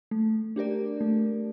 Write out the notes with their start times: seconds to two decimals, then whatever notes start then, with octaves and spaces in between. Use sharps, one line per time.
0.11 A3
0.56 D4 G4 A#4 D5
1.01 A3